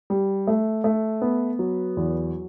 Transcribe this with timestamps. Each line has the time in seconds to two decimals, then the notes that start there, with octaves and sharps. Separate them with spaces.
0.10 G3
0.47 A3
0.84 A3
1.21 B3
1.59 F#3
1.97 E2